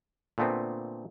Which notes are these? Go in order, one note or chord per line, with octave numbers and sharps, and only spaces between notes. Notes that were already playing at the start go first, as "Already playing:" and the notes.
A#2 D3 A3 B3 C4